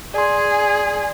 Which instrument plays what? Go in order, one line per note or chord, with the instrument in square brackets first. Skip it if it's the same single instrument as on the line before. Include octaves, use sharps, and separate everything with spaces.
[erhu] G#4 [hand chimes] D5 G#5 C6